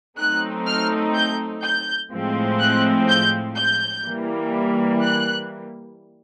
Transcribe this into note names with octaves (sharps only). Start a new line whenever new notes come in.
F#3 A3 C4 D#4 F#6
F6
G6
G6
A2 F3 G#3 C4
F#6
G6
G6
E3 G3 A#3
F#6